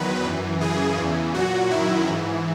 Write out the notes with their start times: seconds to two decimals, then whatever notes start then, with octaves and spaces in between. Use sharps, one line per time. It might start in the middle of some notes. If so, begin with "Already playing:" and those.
Already playing: E2 D#3 F#3 B4
0.24 F#2 E3
0.61 F#2 C#3 E3 G#4
0.97 E2 C#3 E3
1.34 A#2 F#3 F#4
1.70 F#2 D#3 F#3 E4
2.07 G#2 E3